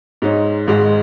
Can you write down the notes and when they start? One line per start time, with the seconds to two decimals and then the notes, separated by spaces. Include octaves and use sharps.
0.22 G#2 G#3 D#4 C#5
0.67 G#1 G#2 G#3